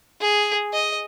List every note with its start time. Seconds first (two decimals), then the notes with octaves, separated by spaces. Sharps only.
0.21 G#4
0.73 D#5